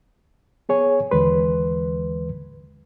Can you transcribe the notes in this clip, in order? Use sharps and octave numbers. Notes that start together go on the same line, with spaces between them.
B3 G#4 C#5 G#5
D#2 D3 E3 G#3 B4 C6